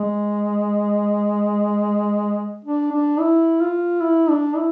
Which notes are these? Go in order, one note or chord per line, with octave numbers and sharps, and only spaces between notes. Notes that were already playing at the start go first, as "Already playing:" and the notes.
Already playing: G#3
D4
D4
E4
F4
E4
D4
E4